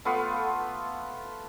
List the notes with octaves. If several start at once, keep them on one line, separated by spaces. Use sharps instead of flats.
A3 B3 F4